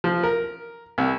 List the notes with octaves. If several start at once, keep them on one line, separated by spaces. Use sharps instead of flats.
F3
A#4
C2